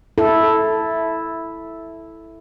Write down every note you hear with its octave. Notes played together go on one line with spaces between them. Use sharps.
E4 A4